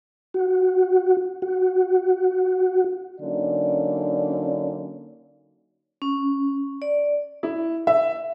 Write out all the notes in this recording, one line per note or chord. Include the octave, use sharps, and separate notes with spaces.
F#4
F#4
D3 F#3 A#3 C#4 D#4 D5
C#4
D5
E4
E5